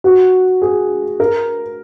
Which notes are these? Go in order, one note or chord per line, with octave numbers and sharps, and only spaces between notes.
F#4
G#4
A#4